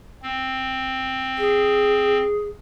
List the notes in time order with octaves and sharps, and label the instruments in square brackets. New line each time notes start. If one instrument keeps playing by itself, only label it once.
[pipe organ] C4
[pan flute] G#4